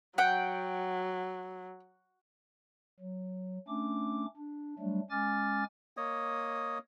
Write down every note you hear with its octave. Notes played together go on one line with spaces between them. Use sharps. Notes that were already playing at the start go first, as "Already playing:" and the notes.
F#3 F#5 G5
F#3
A3 C#4 D4 D6
D4
F#3 G3 A3 D4
G#3 C#4 G#5 D6 F6 A6
A#3 C#5 D#5 D#6